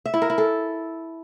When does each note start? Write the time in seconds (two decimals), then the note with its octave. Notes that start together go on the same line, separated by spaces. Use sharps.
0.06 E5
0.14 E4
0.22 A#4
0.30 E4
0.38 A4